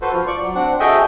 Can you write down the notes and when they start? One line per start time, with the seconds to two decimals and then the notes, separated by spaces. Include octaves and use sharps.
0.02 F#4 A4 B4 C5
0.13 F3 F4
0.27 D5 C#6
0.42 F#3
0.55 C4 D4 F#5
0.80 F#4 G#4 A4 D#5 E5 G5